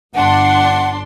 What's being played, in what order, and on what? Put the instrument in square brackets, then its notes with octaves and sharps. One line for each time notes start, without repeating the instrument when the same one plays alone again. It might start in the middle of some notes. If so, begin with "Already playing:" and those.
[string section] G1 D4 C6 [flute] F#5